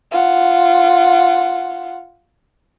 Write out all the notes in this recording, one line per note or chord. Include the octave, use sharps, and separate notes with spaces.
F4 F#5